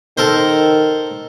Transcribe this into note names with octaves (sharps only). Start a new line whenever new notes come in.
D#3 A4 A#4 C5